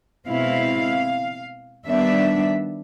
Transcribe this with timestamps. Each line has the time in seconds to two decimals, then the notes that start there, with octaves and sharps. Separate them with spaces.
0.27 B2 G#3 C4 E4 F5
1.86 D#3 G3 B3 D4 E5